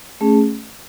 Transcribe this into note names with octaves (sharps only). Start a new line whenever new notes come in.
A3 C#4 G#4